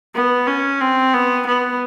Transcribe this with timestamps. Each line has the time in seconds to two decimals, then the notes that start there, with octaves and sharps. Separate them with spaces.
0.15 B3
0.48 C#4
0.81 C4
1.14 B3
1.47 B3